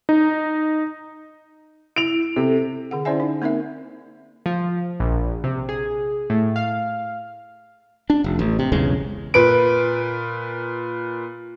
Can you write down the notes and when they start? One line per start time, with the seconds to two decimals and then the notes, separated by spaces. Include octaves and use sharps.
0.09 D#4
1.96 E4 D7 F7
2.36 C3 A4
2.91 D3 G#4 F#5
3.05 C#4 E4 C5 D5 E5 G#5
3.20 D#4
3.42 A#3 C4 D#4 A#4 E5
4.46 F3
5.00 A#1
5.44 C3
5.69 G#4
6.30 A2
6.56 F5
8.10 D4
8.24 F1
8.39 A1
8.59 C3
8.72 B1 E2 C#3 G#3
9.34 A#2 B4 D7